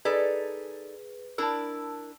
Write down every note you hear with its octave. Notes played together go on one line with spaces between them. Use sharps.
D#4 G#4 A4 B4 D5
D4 E4 A#4 A5 E6